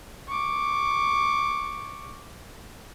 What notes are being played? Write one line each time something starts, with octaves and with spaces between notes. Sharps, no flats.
C#6 D6